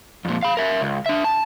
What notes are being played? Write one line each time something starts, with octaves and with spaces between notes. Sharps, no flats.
F2 A#2
F5 B5
A#4 E5
C#2
D4 E5
A5